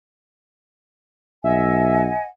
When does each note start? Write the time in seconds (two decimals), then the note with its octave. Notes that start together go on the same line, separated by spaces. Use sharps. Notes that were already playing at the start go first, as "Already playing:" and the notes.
1.44 B1 D#5 E5 F#5 G#5